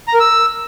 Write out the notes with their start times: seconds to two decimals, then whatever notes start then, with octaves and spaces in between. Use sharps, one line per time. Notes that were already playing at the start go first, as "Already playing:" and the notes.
0.08 A#5
0.14 A#4
0.20 E6